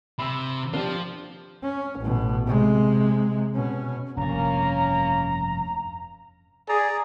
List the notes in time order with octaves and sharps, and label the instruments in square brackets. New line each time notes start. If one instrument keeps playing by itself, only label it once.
[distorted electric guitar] C3 [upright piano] B5 E6
[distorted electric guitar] F3 F4 [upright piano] D4 G4
[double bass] C#4
A1 B2
C3 G#3
B2 C#4
[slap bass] F1 G2 [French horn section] A#3 C#4 [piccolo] A#5
[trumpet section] G#4 [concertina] D5 A#5